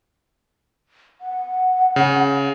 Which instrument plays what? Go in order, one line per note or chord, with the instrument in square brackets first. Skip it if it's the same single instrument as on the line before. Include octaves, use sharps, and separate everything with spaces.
[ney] F#5
[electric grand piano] C#3